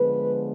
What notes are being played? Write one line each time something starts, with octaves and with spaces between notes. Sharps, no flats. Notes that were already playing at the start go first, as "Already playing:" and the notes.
Already playing: D3 F3 G#3 B3 B4